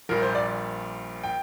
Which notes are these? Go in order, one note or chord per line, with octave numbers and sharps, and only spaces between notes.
A#1 A#2 G3 A#4
C5
D5
G5